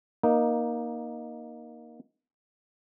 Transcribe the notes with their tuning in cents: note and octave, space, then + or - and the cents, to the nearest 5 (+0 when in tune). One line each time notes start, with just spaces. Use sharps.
A#3 +15 D#4 +0